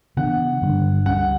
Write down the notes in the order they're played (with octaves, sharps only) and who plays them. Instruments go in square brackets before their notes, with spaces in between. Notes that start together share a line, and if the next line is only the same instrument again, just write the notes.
[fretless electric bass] C#3 E3 B3 D4 [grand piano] F#5
[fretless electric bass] G2 D3 G3 D4
[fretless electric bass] C#2 C#3 G3 C#4 [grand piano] F#5